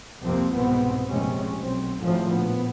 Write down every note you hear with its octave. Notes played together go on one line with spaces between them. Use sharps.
C2 F2 C3 F3 A#3 C4
C2 G#2 B2 B3 C4
F1 A#1 C3 G#3 C#4
B1 C4
G#1 D2 A2 F3 A3
A#1 B3